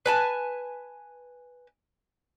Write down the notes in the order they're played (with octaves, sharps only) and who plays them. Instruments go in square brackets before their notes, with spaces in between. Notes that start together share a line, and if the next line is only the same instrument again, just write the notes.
[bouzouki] B4 G#5 A5